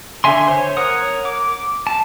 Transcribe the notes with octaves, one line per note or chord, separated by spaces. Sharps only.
D3 E5 G#5 C6
C5 C#5
A#4 C#5 F#5 D#6
D6
A5